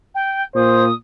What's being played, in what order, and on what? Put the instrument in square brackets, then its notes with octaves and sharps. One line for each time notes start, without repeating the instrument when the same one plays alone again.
[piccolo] G5
[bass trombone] A#2 [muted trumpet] C5 [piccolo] D#6